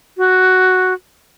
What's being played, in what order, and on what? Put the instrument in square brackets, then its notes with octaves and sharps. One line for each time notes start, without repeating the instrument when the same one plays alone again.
[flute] F#4